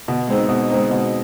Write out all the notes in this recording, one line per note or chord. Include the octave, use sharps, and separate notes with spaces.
B2
G#3 C4 D#4
B2
G#3 C4 D#4
B2